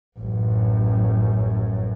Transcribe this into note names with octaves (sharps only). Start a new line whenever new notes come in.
A1 F#2